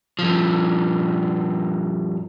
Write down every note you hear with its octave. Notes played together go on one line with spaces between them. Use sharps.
G2 F3